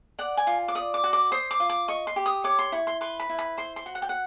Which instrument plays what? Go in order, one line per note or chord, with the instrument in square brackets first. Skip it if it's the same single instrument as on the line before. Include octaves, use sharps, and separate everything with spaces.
[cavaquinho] D5 F#5
G#5
F4
D6
D5 D#6
D6
F#4
D6
C5 D#6
D6
F4
D6
D#5 C#6
C6
G4
D#6
C#5 D6
C6
E4 C#6
C6
B4 C6
B5
E4
B5
C5 C6
C6
F#4
F#5
G5
F#5